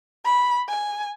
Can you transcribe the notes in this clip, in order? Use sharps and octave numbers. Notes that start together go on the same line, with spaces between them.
B5
G#5